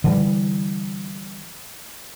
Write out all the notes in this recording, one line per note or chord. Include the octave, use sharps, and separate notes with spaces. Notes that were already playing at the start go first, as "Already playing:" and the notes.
D3 E3 G3